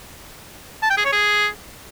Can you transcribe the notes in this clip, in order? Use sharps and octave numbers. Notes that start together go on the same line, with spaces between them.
A5
G5
G#4
C#5
G#4